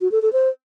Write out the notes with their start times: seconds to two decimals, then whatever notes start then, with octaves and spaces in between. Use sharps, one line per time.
0.01 F#4
0.12 A4
0.22 A4
0.33 C5